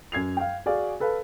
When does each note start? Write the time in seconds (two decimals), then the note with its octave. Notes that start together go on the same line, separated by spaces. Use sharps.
0.12 F#2 G#6 C7 F7
0.37 F5 G5
0.66 F#4 G#4 D5 F5
1.00 A4 B4 F5